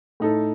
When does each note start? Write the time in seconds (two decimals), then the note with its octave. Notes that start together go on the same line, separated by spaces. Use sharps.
0.20 A2 A3 D#4 A4